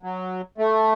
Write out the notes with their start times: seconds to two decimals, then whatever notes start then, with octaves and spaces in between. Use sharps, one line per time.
0.03 F#3
0.58 A3